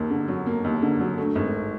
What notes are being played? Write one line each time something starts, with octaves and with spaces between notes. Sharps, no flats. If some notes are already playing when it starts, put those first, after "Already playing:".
Already playing: D#2 A#3
D3
F#3
A#3
D#2
D3
F#3
A3
G#1